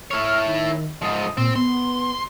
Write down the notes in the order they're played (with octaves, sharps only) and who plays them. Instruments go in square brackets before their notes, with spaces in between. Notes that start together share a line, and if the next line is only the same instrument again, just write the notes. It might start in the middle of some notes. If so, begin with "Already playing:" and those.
[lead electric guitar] E4 C#5 [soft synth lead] F6
[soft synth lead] D#3
[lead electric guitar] G#2 F3 [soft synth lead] D#6
[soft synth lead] A#2 [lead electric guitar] C4
[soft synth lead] B3 [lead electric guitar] C6